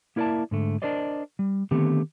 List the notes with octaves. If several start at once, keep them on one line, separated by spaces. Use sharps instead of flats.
A#3 E4 A#4 D5 E5 A5
G#2 D3 A3
D4 A#4 C5 D5 D#5
G3
D3 D#3 A3 B3 C4 G4